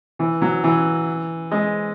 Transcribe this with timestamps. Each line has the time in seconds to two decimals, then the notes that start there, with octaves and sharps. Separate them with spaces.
0.19 E3
0.42 F#3
0.64 E3
1.51 G#3